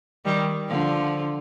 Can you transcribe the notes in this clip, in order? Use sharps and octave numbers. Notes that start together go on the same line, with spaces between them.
D#3 G3
D3 F3